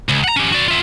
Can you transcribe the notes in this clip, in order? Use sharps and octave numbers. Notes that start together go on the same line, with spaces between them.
C#2
F#5 A#5
C#4 G4
F#4 D5
F4 E5